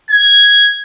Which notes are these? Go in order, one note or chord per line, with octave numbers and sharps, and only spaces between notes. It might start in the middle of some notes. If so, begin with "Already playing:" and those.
G#6